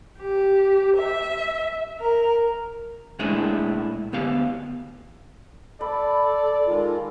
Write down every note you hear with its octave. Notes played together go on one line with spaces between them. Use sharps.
G4
E5
A#4
A#2 G#3 A3 D4 E4 G#4
D2 B3 G4 F5
A4 D5 B5
D#3 G#3 F4